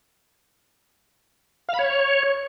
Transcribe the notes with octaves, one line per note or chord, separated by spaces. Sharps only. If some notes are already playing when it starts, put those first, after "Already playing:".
F5
B5
C#5